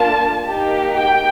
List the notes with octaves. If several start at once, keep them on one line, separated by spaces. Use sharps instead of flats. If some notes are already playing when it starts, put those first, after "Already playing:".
Already playing: A#3 D4 F4 A5
A#3 D#4 G4
G5